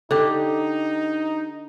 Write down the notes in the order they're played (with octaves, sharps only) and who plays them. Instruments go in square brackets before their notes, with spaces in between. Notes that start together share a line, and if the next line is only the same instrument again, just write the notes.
[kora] D3 G4 [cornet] D#4